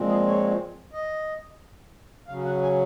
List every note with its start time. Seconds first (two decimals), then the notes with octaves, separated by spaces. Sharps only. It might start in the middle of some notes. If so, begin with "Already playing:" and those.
Already playing: A#2 F3 G#3 C4
0.09 G#4
0.26 C#5
0.93 D#5
2.28 C#3 F#3 C#4 F5
2.45 F#5
2.63 G#5